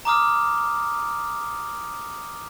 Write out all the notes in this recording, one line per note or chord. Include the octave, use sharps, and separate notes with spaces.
A#5 D6 D#6 F6